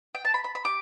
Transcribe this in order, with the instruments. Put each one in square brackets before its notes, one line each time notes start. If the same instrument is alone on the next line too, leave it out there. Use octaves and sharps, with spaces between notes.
[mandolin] G5
A5
B5
B5
B5
G4 D6